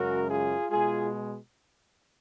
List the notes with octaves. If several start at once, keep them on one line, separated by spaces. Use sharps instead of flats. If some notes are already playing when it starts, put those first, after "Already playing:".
Already playing: F#2 C#3 G#3 F#4 A#4
F4 G#4
B2 G#3 F4 G#4